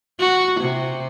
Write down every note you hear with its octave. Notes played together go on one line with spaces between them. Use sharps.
F#4
C3